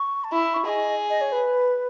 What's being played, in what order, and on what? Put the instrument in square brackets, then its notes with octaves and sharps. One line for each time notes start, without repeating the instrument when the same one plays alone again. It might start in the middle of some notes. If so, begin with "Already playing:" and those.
Already playing: [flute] C#6
A5
[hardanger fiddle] E4 [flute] B5
[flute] B5
C#6
[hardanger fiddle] G#4 [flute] D#5
[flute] D#5
C#5
B4